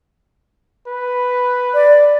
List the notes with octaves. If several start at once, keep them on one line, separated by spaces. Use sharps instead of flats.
B4
D5